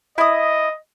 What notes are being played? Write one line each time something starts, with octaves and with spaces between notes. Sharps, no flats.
E4 D#5 D#6